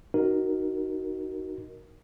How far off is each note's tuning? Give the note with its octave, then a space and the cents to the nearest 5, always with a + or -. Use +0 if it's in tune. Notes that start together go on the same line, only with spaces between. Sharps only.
D#4 +0 F#4 +15 A#4 +0